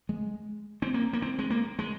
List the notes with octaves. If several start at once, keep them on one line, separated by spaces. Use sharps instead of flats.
G#3
C4
A#3
A#3
C4
G#3
A#3
G#3